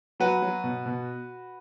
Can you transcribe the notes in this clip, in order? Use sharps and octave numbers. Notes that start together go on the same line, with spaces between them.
F#3 F#4 B4
F#3
B2
B2